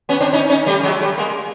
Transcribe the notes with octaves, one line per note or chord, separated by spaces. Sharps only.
B3 C#4
C4 D4
C#4 D#4
C#4 D#4
G3 A3
F#3 G#3
G3 A3
G#3 A#3